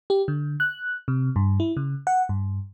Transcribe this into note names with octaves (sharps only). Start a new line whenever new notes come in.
G4
D3
F#6
C3
G2
E4
C#3
F#5
G2